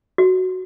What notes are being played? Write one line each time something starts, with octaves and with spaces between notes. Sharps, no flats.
F#4